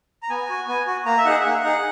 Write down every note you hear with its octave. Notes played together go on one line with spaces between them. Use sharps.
A#5
B3 G#5
F#4
B3
F#4
A#3 A#5
E5
D#4 G#4 F#5
E5
A#3 F#5
D#4 G#4